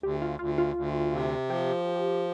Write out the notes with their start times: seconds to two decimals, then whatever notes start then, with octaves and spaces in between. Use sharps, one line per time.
0.03 D2 G4
0.22 F4
0.39 D2 F4
0.58 F4
0.76 D2
1.13 C3
1.49 F3 G4